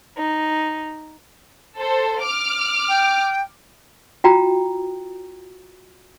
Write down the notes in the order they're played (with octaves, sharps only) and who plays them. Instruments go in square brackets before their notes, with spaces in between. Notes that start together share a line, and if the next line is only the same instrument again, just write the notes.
[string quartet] D#4
[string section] A4 C5
D6 F6
[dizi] G5
[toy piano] F4 F#4 G5 A#5